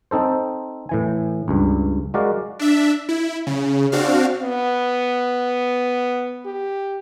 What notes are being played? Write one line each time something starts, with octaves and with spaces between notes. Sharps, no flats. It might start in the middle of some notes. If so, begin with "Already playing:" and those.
C4 D#4 A4 C5
A2 E3 G#5
C#2 G2
G#3 F#4 A#4 D5 F5
D4 E5
E4
C#3
C4 D4 F#4 F5
B3
G4